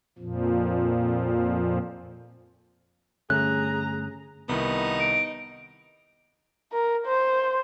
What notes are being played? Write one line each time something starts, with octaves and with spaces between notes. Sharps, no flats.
F2 A#2 F3
G2 D3 A3 C#4 G#4 A#5 F#6
C2 D#3 B3 D#4 E4
D7
A#4
C5